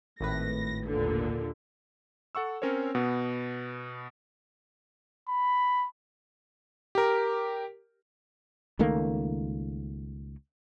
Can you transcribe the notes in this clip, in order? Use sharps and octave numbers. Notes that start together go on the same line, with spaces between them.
G#1 A2 B4 A#6
D#2 A#2 D3
A4 F#5 C#6 E6
C4 C#4 A#4 C5 C#5
B2 B3
B5
G4 A#4
C#2 D#3 A3 A#3